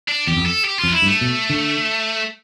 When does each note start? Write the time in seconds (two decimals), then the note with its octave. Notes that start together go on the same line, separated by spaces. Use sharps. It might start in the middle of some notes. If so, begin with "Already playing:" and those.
0.08 D4
0.27 E2 G4
0.37 F2
0.46 A4
0.65 G4
0.79 F2 F4
0.88 D4
0.93 E4
1.02 G2
1.07 A3
1.21 B2
1.50 D3